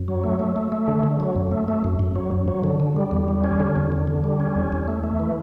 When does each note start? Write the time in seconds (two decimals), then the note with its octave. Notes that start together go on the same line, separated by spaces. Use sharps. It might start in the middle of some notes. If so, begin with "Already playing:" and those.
Already playing: F#2
0.08 F#3
0.24 A3
0.39 A3
0.56 A3
0.72 A3
0.88 D3
1.03 D3
1.20 F#3
1.36 F#2
1.51 A3
1.68 A3
1.84 F#2
1.99 F#2
2.15 F#3
2.31 F#2
2.48 F#3
2.64 D3
2.80 D3
2.96 G3
3.11 E2
3.28 G3
3.44 C#4
3.60 D3
3.76 E2
3.92 D3
4.07 D3
4.24 G3
4.40 C#4
4.55 E2
4.72 E2
4.88 A3
5.04 A3
5.20 E3